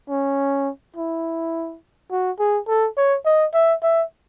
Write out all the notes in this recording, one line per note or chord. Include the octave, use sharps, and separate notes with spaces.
C#4
E4
F#4
G#4
A4
C#5
D#5
E5
E5